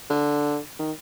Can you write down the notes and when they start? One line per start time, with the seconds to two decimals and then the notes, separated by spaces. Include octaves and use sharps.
0.10 D3
0.79 D#3